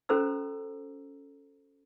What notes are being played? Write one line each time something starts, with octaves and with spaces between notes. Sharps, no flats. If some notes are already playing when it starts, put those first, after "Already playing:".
C#4 F#4 A4 C5 A#5 E6